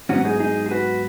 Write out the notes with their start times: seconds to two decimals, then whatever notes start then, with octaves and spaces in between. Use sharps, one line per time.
0.09 G#2 F#3 B3 C#4 F#4
0.25 D#4 G#4
0.40 D#4 G#4
0.66 G#4
0.71 F#4 B4